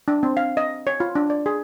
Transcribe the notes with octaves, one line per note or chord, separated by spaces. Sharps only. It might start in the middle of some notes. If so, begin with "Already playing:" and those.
D4
C4
F5
D#5
C#5
F4
D4
D5
G#4